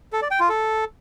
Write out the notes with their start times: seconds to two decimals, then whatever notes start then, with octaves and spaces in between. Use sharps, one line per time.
0.13 A4
0.22 D5
0.31 G5
0.40 F4
0.49 A4